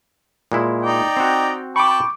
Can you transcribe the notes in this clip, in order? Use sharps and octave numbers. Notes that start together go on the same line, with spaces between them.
A#2 G#3 E4
D#4 D5 G5
C4 F#4
G5 A5 B5 C#6 D6